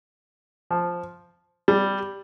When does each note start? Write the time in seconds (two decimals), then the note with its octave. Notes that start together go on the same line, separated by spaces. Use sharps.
0.71 F3
1.68 G3